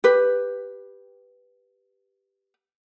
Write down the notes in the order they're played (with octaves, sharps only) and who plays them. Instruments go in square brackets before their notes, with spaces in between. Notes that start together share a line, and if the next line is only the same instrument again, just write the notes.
[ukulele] G4 B4